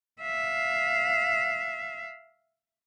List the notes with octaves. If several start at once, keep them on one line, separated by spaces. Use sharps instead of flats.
E5 F5